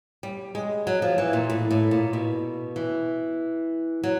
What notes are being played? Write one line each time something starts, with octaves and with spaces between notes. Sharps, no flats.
G3
G#3
F#3
F3
E3
A#2
A2
A2
A#2
B2
E3
F#3